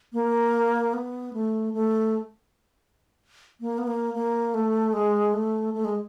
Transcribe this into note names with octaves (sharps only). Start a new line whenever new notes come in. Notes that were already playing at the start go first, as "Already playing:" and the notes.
A#3
B3
A3
A3
A#3
B3
A#3
A#3
A3
G#3
A3
A3
G#3